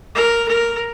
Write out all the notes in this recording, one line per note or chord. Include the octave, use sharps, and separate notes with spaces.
A#4
A#4